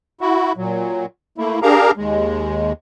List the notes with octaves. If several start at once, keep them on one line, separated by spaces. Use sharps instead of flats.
E4 F#4
A#2 F#3
A3 A#3 E4
D4 G4 G#4 A#4 F5 A#5
D#2 G#3